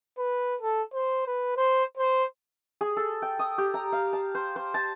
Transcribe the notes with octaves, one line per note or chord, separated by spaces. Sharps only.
B4
A4
C5
B4
C5
C5
G#4
A4
G5
D#6
G4
A#5
F5
A5
C5
C5
A5